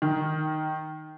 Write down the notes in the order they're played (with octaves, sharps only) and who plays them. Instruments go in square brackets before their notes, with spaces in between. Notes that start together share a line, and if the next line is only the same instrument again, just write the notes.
[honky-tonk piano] D#3